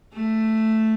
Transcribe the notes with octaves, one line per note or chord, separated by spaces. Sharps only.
A3